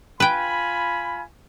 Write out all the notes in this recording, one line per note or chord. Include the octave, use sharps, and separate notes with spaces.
F4 B4 G5 G#5 B5